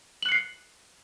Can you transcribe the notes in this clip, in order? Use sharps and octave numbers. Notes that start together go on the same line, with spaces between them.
F#6 C7 C#7 F#7